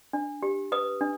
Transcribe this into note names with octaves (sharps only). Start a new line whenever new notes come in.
D4
G4
B4 D#6
D4